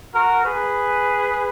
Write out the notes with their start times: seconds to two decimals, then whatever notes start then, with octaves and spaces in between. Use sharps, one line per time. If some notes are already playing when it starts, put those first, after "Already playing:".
0.14 F#4 A#4
0.45 G#4 B4